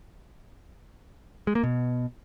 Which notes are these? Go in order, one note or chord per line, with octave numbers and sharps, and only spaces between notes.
G#3
A#3
B2